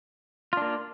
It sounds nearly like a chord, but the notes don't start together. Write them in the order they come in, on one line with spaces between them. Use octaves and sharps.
F4 D4 A#3